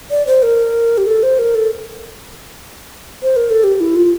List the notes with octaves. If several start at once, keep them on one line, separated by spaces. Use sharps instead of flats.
D5
C5
A#4
G4
A4
C5
A#4
A4
C5
A#4
A4
G4
E4
F4